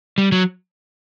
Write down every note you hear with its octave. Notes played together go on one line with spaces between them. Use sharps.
G3
F#3